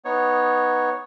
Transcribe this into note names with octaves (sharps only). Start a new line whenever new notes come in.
B3 D#4 C#5